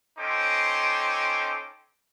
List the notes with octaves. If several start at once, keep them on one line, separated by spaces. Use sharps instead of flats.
C#4 D#4 A4 C5 G5 D6